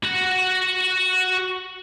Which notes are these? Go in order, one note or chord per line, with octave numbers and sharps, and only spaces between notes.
F#4 F#5